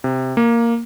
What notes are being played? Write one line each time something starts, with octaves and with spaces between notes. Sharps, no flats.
C3
A#3